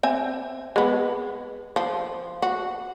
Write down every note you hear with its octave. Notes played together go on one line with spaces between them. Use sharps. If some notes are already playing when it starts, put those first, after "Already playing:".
C4 E5 G#5
G#3 B3
F3
F#4